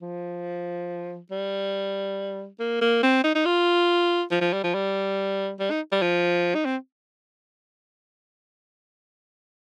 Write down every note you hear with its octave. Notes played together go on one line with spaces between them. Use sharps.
F3
G3
A#3
A#3
C4
D#4
D#4
F4
F3
F3
G3
F3
G3
G3
D#4
G3
F3
D#4
C4